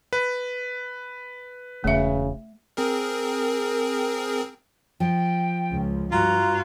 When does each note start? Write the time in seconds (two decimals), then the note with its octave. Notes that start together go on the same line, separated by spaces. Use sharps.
0.13 B4
1.84 E1 C#3 A3 E5
2.77 C4 G#4 A#4
5.00 F3 G5
5.71 C#2
6.12 G2 F4 F#4 A#5